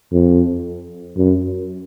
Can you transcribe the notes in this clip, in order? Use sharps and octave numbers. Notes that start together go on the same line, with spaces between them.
F2
F#2